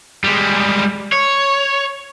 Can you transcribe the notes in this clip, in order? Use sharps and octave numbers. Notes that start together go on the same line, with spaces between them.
G3 G#3
C#5